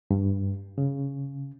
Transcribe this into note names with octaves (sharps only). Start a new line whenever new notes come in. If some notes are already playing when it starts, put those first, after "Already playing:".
G2
C#3